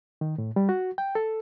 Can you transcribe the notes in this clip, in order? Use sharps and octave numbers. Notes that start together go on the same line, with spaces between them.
D#3
A2
G3
F#4
G5
A4